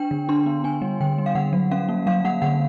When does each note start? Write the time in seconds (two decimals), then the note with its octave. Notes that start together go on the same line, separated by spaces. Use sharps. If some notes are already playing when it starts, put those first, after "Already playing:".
Already playing: D4 G5
0.11 D3
0.29 D4 C6
0.46 B3
0.64 D4 G#5
0.82 G3
1.01 D3 G5
1.18 G3
1.26 F5
1.35 D3 F#5
1.53 F#3
1.71 C#4 F5
1.89 A#3
2.06 F#3 F5
2.25 A#3 F#5
2.42 D3 F#5